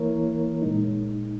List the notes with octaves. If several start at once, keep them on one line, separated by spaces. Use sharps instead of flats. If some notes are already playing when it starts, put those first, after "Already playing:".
Already playing: E3 A#3 E4 A#4 C#5
A#2 G#3 D#4